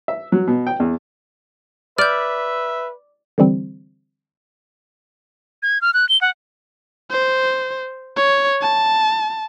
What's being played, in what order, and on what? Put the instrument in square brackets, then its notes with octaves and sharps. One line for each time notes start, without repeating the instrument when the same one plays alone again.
[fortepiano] E5
F#3
B2
G5
E2
[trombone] B4 [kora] D5 [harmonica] E5 [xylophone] F6 G6
[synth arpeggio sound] D3 E3 G3 C4
[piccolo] G#6
F6
F#6
G7
F#5
[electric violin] C5
C#5
A5